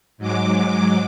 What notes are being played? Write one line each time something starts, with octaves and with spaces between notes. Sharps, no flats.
G#2 F#3 G#3 D6